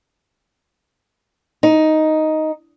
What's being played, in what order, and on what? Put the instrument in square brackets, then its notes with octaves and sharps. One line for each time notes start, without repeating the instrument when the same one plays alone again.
[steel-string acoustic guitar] D#4